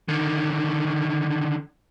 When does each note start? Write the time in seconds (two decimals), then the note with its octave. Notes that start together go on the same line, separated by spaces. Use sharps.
0.08 D3 D#3